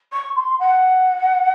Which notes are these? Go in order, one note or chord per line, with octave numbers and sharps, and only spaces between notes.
C#6
C6
F#5